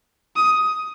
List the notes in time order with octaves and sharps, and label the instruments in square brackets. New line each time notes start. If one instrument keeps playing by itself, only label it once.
[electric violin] D#6